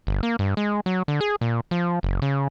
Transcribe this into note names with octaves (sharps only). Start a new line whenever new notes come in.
G1
A#3
G2
G#3
F#3
D3
G#4
A#2
F3
F#1
C#3